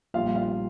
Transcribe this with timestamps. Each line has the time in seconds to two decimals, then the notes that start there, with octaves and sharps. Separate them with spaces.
0.14 A#1 A#2 G3 F4 F5
0.35 F4 F5